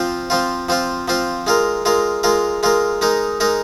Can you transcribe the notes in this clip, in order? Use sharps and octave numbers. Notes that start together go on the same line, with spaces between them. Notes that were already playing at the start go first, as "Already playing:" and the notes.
Already playing: F3 C4 F4
F3 C4 F4
F3 C4 F4
F3 C4 F4
G#3 F4 A#4
G#3 F4 A#4
G#3 F4 A#4
G#3 F4 A#4
G#3 D#4 A#4
G#3 D#4 A#4